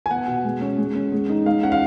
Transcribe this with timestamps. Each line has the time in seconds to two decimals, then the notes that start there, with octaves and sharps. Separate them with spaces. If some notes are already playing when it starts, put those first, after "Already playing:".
0.06 G#5
0.11 B3 F#5
0.27 B2
0.44 G#3
0.61 C#4
0.78 G#3
0.95 C#4
1.13 G#3
1.30 D#4
1.46 G#3 F5
1.63 C#4 F#5
1.72 F5